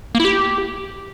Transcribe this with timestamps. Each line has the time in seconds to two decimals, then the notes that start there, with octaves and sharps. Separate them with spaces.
0.15 A#3
0.20 E4
0.25 G4